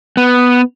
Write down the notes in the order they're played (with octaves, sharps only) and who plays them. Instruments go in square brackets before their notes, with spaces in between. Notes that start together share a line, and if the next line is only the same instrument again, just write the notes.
[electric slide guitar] B3